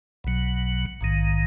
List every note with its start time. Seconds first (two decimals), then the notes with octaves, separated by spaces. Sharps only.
0.24 B1 B2 F#3
1.01 A#1 G#2 D#3